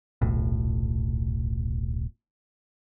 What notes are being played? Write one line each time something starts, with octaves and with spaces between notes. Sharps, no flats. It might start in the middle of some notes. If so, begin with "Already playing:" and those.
D#1 B1 A2